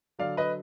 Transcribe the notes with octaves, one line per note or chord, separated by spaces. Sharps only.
D3 F#3 D5 F5
B4 D#5